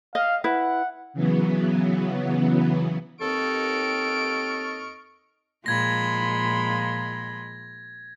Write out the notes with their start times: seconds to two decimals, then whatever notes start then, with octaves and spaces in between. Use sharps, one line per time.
0.15 D#5 F5
0.44 E4 B4 F#5
1.13 C#3 E3 F#3 B3
3.21 D#2 C4 A4 D#5 C#6 F6 D7
5.66 A#2 F3 G#3 B5 C6 G#6 A#6